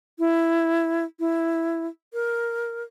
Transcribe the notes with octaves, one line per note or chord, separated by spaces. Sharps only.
E4
E4
A#4